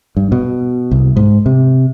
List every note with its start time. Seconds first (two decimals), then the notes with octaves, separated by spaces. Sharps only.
0.17 G2
0.32 B2
0.91 C2
1.17 G#2
1.46 C3